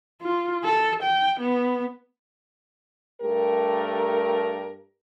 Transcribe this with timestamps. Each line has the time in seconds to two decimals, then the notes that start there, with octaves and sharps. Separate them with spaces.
0.21 F4
0.64 A4
1.02 G5
1.40 B3
3.21 G2 A3 G4 A#4